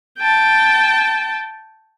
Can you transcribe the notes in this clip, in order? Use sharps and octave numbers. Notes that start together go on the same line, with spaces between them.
G5 A5